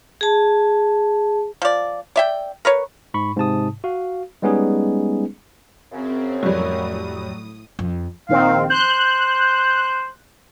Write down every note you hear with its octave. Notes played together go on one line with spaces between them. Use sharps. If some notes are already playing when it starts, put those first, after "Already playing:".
G#4 A5
F3 D5
D5 E5 G5
A#4 B4 C#5
G#2 B5 C#6
G#2 C3 A5 D#6
F#4 F5
G3 G#3 B3 C#4 D#4 G#4
F#2 C#3 C4
F2 A2 F#3 G3 D#6
F2
A#1 D#3 C4 F5
C5 F#6 G6